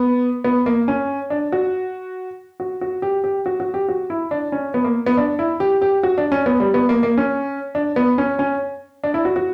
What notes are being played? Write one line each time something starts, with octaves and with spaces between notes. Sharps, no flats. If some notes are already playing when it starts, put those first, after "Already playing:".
Already playing: B3
B3
A#3
C#4
D4
F#4
F#4
F#4
G4
G4
F#4
F#4
G4
F#4
E4
D4
C#4
B3
A#3
B3
D4
E4
G4
G4
F#4
D4
C#4
B3
G3
B3
A#3
A#3
C#4
D4
B3
C#4
C#4
D4
E4
F#4
F#4